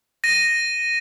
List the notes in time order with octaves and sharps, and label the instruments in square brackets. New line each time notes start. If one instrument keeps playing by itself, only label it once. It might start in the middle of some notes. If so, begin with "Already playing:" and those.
[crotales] A#6 D#7